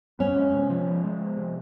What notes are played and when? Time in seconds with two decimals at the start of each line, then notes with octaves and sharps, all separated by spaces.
0.19 B3 C#4
0.36 G#3
0.54 C3
0.70 F3
0.87 B3
1.04 G#3
1.21 F3
1.37 C3